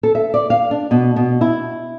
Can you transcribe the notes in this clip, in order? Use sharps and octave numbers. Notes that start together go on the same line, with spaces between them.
A4
E5
D5
F5
D4
B2
B2
E4